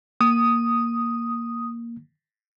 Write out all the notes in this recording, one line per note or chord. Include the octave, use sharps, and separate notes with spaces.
A#3 D#6